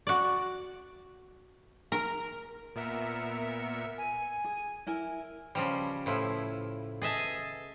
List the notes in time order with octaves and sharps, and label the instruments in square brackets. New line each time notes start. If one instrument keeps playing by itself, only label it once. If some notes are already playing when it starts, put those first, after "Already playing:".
[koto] F#4 D5
A#4
[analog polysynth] A#2 B3 A#4 E5 C#7
[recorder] G#5
[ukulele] G#4
E4 A#4 G#5
[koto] C#3 F3 G3
A2 F3 E4
G#4 D#5 E5 A5